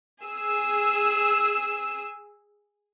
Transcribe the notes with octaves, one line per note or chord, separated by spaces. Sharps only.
G#4 E6